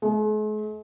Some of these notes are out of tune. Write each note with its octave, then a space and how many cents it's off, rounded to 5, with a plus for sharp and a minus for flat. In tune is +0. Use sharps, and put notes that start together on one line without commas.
G#3 +45